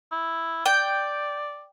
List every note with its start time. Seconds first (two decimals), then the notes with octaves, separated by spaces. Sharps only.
0.12 E4
0.66 D5 G5